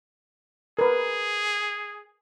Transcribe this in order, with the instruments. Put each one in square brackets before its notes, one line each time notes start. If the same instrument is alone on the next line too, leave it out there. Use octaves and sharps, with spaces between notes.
[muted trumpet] G#4 [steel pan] A#4 B4